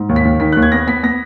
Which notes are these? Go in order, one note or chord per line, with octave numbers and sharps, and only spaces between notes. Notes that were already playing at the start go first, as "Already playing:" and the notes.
Already playing: G#2
D#2
B6
D#2
D#3 B6
D#2 F#6
G#6
B3 A#6
B3 B6
B3 A#6